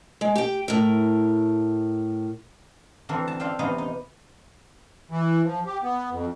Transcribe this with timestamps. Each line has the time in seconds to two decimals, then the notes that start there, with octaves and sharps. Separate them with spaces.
0.21 G#3
0.36 G4 G5
0.68 A2 A#4
3.09 D3 E3 C4 A4 A#4
3.28 A5
3.40 F4 D5 E5 F5 G5
3.59 E2 C3 B3 D#4 F5
3.78 D#4
5.11 E3
5.44 F3
5.66 G4
5.83 B3
6.11 F2